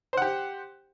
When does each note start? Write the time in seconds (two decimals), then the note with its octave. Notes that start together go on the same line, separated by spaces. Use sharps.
0.13 C5
0.17 F#5
0.22 G4